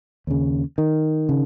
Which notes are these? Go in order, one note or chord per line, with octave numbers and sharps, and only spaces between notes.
D#2 C#3
D#3
C#3